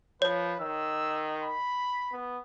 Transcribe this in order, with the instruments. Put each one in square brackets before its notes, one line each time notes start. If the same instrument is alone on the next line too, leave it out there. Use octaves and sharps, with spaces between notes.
[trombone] F3 [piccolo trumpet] B4 [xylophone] C#5
[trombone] D#3 [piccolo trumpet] E6
[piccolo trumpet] B5
[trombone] B3